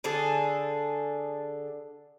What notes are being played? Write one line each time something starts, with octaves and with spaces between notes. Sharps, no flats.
D3 G#4 A4